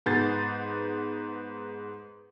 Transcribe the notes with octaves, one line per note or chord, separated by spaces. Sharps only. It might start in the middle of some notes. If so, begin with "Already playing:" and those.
G#2 B3 G6 A6 C7